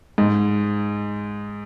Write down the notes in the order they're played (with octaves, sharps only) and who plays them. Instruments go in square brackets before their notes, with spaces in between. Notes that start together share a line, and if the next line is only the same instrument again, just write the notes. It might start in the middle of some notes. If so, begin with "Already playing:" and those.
[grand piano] G#2